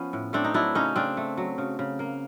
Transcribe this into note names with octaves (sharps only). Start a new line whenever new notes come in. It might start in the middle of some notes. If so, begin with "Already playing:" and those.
Already playing: F3 B3 C#4
A2
A3 C4 D4
D#4
F#3 D4 E4
C#3 C#4 D#4
C#3 C4 D4
A3
F#3
C#3
C#3
A#3